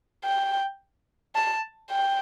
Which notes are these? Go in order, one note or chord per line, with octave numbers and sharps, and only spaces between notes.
G5
A5
G5